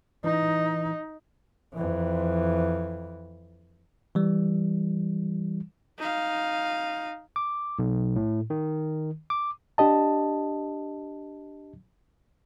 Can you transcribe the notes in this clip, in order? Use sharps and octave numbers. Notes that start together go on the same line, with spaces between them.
E3 D#4
F2 E3
E3 G3
D#4 F5
D6
B1
A2
D#3
D6
D4 G4 D#5 A5